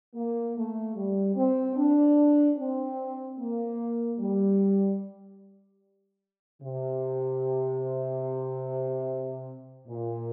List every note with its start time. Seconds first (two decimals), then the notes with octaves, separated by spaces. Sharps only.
0.15 A#3
0.56 A3
0.96 G3
1.36 C4
1.77 D4
2.57 C4
3.39 A#3
4.20 G3
6.62 C3
9.88 A#2